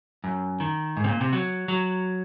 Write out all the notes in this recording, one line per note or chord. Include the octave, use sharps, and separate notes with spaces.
F#2
D#3
G#2
C3
A#2
C3
F#3
F#3